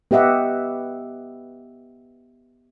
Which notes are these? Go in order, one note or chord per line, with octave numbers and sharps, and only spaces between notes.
B3 G4 D#5 E5 F#5